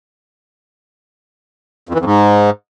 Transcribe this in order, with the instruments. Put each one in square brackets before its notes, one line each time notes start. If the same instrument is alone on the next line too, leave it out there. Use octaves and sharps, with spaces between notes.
[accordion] F2
E3
F2
G#2